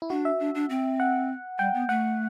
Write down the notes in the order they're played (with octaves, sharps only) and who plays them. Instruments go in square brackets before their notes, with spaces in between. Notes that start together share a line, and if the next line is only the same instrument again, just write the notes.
[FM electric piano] E4
[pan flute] D4 [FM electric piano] F#4
[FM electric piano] E5
[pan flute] D4
D4
C4
[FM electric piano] F#5
[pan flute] G3 [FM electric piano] G5
[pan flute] B3
[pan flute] A3 [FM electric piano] F#5